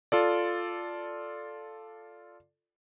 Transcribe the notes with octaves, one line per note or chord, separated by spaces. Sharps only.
F4 A4 D5